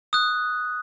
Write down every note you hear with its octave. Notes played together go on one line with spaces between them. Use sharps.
D#6 F#6